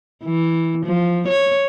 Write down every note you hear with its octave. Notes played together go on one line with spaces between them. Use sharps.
E3
F3
C#5